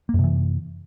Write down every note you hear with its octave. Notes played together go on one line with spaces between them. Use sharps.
F#2 C3 E3 A#3